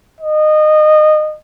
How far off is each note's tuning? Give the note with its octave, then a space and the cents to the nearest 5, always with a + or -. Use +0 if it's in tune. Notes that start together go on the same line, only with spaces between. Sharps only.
D#5 -20